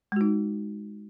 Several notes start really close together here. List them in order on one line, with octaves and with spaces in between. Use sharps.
G#3 F#4 D#4